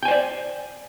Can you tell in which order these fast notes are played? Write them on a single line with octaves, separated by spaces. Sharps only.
G5 G#5 C5 D5